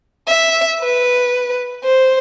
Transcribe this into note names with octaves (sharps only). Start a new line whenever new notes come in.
E5
B4
C5